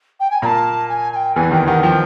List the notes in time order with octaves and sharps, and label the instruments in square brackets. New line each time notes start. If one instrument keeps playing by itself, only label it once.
[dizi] G5
G#5
[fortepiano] A#2 A#3 [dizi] A5 B5
[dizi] G#5
G#5
G5
[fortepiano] E2 E3 [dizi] G#5
[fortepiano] D#2 D#3 [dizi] G5
[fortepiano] D#2 D#3 [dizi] F#5
[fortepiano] F3 [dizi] G5